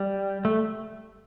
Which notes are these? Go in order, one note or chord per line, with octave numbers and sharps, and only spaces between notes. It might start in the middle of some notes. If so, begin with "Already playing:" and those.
Already playing: G3
A3